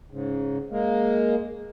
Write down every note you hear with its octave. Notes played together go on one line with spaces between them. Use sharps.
G#2 C#3
G#3 A#3